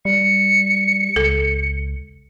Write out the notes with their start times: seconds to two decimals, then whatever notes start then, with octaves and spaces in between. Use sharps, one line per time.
0.05 G3 C#7
1.16 C#2 A4